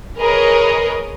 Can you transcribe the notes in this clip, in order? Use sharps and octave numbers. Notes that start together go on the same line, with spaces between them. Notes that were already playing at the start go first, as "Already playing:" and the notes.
G#4 A#4 B4 C#5 D#5